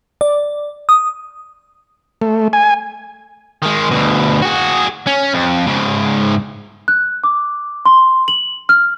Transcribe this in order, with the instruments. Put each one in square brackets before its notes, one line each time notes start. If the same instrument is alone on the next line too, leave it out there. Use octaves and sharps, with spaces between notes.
[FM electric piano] D5
D#6
[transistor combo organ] A3
G#5
[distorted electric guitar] D#3 G#3
D2 B2
F#4 G#4
C#4
F2
G#2 C#3
[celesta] F#6
D6
C6
F#7
F6